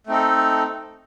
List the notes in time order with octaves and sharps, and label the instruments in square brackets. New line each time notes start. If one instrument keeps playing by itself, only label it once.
[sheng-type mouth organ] A3 C4 D#4 A4